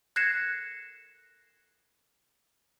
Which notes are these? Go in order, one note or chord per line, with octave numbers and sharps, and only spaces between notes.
F#6 G#6 A#6 C7 C#7 E7